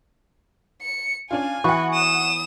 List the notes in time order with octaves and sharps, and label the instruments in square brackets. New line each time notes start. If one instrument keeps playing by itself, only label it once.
[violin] C#7
[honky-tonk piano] C#4 D4 F4 [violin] G#5
[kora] E3 B3 F#4 [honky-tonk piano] F#5 C#6
[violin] D#6 E7